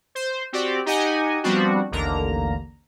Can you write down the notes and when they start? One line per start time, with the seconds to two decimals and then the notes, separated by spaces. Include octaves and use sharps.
0.15 C5
0.53 C4 F#4 G4 D5
0.86 D#4 G4 D#5 F#5 G#5
1.43 F3 G3 B3 C4 D4 F#4
1.91 A1 D#2 D3 A#3 A#5